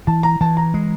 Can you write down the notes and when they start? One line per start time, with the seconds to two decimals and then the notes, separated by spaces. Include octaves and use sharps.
0.07 E3 A5
0.23 A#5
0.41 E3 A5
0.57 A#5
0.74 G#3